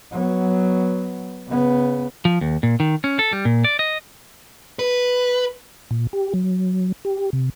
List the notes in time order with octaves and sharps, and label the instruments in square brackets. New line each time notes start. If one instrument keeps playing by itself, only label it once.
[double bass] F#3 B3
C#3 B3
[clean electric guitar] F3
D#2
A#2
D#3
C#4
A4
G3
A#2
D5
D#5
[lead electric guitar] B4
[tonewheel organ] A#2
G4
F#3
G4
C3